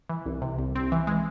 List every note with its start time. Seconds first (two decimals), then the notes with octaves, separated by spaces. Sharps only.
0.10 E3
0.26 C2
0.42 C3
0.58 C2
0.75 C4
0.92 E3
1.07 G#3